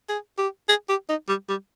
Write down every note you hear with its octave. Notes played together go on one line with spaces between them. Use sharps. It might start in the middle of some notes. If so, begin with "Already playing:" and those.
G#4
G4
G#4
G4
D#4
G3
G3